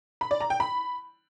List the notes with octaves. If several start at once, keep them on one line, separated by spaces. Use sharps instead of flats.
B5
D5
A#5
G5
B5